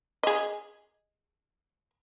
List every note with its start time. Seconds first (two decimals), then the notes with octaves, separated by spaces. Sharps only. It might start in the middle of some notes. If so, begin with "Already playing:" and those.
0.23 G#4 D#5